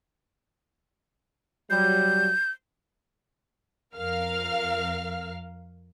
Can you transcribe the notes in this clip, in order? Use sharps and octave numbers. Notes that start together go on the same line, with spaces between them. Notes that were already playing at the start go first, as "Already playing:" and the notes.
F#3 G3 G6
F2 A#4 F5 F6